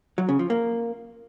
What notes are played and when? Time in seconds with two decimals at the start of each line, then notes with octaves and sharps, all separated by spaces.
0.18 F#3
0.29 C#3
0.39 F3
0.50 A#3